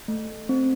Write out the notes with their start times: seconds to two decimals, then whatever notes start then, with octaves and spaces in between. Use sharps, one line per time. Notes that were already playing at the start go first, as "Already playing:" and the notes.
0.08 A3
0.49 C4